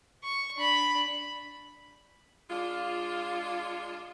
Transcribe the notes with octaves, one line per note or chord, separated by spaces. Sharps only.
C#6
D4 B5
G#3 D4 F4